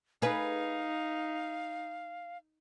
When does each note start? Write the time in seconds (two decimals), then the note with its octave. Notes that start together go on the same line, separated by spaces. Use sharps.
0.22 D#4 G#4 B4 F5